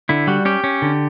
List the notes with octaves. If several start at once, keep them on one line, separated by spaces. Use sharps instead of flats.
D3 E4
G3 F#4
C#4 G4
C#4
D3